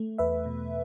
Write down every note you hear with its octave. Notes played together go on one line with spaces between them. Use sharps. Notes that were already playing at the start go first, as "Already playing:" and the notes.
Already playing: A3
E2 B4 E5
B2